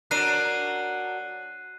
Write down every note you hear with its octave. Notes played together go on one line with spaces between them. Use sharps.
F#3 D4 A#4 F#6 C7 D#7